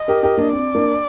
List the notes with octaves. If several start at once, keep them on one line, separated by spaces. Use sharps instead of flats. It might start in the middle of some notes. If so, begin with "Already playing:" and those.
Already playing: D#5
G4 A#4
G4 A#4
A#3 D4
C4 D5
A#3 D4